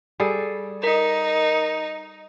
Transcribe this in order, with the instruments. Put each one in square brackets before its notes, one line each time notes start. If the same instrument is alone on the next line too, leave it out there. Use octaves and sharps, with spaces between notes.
[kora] G3 G#4 A4
[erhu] D#4 [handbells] A#4